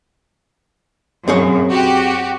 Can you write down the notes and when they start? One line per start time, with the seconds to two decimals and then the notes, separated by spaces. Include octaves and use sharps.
1.28 F#2 C4 G#4 C#5
1.72 F#4 G4